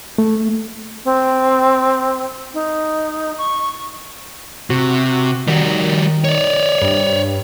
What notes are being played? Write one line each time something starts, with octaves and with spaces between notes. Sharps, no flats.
A3
C4
D#4
C#6
C3 F#4
D#3 G3 F#4
C#5 D5
G2